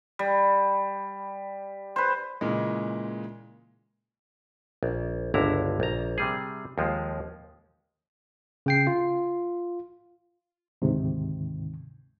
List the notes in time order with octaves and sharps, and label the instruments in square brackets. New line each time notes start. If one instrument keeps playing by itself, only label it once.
[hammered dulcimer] G3
B4 C5
[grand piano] A#2 C#3 E3 G#3
[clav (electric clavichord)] A#1
G1 C#2 D3 E4 A#5
A#1 A#5
C3 G3 G#4
D#2 F3 G#3
[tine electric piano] C#3 G5 C7
F4
[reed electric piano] D2 G#2 C3 D#3